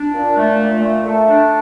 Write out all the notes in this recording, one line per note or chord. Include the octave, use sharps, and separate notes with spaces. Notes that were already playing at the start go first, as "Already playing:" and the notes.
Already playing: D4
A#2
A3
A#2
A3
A3
D4